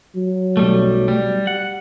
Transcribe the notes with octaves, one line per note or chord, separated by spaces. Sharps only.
F#3
B1 G3 A3
G3
F#5